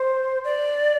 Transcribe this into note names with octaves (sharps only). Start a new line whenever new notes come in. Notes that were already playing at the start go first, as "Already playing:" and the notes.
Already playing: C5
D5